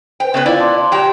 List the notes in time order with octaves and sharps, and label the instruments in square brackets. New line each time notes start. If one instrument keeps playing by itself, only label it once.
[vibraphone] B4 C5 [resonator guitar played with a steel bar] G5
[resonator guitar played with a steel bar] C#3 C#4 B4 [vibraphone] B3
[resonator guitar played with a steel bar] E4 D5 [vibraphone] F4 C5 F5
[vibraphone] A5 C6 D6
[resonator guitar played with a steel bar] F#3 G5 A#5 [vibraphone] G4